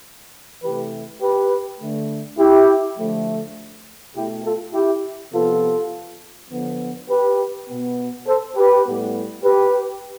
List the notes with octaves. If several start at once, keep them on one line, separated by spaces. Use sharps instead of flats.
C3 E3 A3 G4 B4
G4 B4
D3 A3
E4 G4
D3 F3 A3
B2 A3 E4 G4
F4 A4
E4 G4
C3 F3 B3 F4 A4
D3 F3 B3
G4 B4
B2 B3
A4 C5
G4 B4
A2 G3 B3
G4 B4